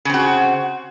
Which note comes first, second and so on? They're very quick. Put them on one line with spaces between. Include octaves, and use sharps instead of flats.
C#3 C4 F#4